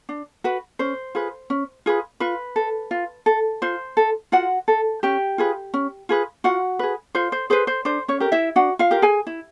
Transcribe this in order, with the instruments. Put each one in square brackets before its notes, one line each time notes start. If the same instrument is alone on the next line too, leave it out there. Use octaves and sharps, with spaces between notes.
[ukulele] D4
F#4 B4
C#4 C5
F4 G#4 B4
C#4
F4 G#4 B4
F4 B4
A4
F4
A4
F4 C5
A4
F4 F#4 F#5
A4
C#4 G4 G5
F4 G#4 B4
C#4
F4 G#4 B4
F4 F#4 F#5
G#4 B4
F4 C5
C5
G#4 B4 C5
C5
D4 C5
C#4 C#5
G4 A#4
E4 E5
D4 F#4 F#5
F4 F5
G4 A#4
G#4 G#5
E4